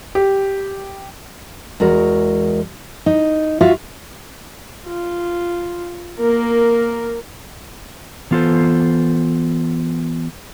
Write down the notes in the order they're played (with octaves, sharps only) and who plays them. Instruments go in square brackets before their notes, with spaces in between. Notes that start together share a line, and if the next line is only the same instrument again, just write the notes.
[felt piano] G4
[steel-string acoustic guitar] E2 G#3 F#4 A#4
D#4
F4 F#4 E5 F5
[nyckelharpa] F4
A#3 A#4
[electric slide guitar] E3 B3 F4 A4 C5